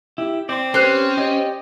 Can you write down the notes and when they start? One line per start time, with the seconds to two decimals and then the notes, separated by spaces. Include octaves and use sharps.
0.18 E4 G4
0.49 C4 D5 C6
0.74 C#4 G4 B4 C5 F#6
1.17 G4 D5 D#5